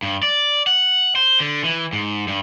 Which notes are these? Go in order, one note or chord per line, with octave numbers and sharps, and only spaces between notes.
G2
D5
F#5
C5
D3
E3
G#2
G2